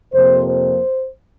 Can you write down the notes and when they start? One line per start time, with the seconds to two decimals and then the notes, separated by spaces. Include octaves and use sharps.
0.12 F2 C3 F3 A#3 C5
0.46 C5